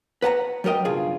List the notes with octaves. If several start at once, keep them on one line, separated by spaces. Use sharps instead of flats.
B4 F#5 A5 A#5
F#3 G3 A#4 D#5 G5
B1 G2 C#3 F4 G#4